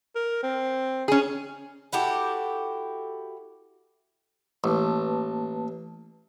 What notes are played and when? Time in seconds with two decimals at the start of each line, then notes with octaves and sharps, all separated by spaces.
0.15 A#4
0.43 C4
1.08 C#4 G#4
1.93 E4 F#4 G4 A4
4.64 A1 A#3 B4 A5